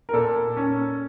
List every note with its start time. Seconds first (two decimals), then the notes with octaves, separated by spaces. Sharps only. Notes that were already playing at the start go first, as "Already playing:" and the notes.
0.09 A#4
0.13 A#2 A4
0.36 A#3
0.57 C#4